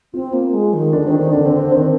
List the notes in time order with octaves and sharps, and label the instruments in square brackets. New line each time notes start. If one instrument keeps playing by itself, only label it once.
[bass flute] C4 [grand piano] F4
[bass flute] A#3
G#3
D#3
[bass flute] D3 [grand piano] D4
[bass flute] D#3 [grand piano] C4
[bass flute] D#3 [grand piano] D4
[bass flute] D3 [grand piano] D4
[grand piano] C4
[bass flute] D3
[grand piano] C4
[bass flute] D#3 [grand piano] C4